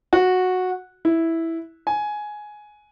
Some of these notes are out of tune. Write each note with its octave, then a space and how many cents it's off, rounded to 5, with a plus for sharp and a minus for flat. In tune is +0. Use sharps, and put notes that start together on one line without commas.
F#4 -10
E4 -5
G#5 +10